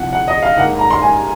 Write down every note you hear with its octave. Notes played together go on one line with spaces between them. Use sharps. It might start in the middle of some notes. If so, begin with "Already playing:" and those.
Already playing: C2 C3 F3 F#5
F#5
D#5
F5
G#2 D#3 A#3 F#5
A#5
C6
G#5